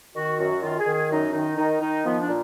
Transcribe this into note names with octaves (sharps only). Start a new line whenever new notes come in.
D#3 F#4
F#2 F#4
D#3 F4
G#4
D#3
G#4
F#2 D#4
D#3 D#4
D#3 D#4
D#3 D#4
F3 B3
D4
A#2